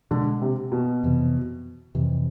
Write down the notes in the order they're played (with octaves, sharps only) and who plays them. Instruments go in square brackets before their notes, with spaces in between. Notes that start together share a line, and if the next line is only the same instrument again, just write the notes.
[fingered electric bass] B2 G#3 D4 [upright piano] D3
[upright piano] C3
B2
[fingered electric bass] F2 C3 E3
F2 C3 E3